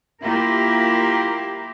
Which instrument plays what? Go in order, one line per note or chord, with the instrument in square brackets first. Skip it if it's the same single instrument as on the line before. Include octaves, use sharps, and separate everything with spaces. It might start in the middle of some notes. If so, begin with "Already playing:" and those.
[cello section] A#3 E4 F4 G4 A#4